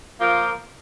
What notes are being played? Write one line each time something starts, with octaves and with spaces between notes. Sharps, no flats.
F3 A#3 F4 A#4